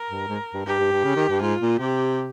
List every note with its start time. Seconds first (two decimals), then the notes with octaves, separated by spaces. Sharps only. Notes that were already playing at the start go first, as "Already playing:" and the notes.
Already playing: A#4
0.10 G2
0.28 G#2
0.54 G2
0.66 G2 G4
0.79 G2
0.92 G2
1.04 C#3
1.16 D#3
1.29 G2
1.41 G#2 F4
1.61 A#2
1.79 C3 G4